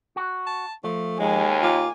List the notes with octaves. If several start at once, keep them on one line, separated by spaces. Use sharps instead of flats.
F#4
A5
F3 A3
D#2 G#3 G#5
A#3 F4